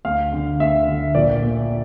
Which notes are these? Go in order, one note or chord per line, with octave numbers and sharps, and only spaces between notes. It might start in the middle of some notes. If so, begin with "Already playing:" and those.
D2 F5
D3
D2 E5
D3
A#1 D5
A#2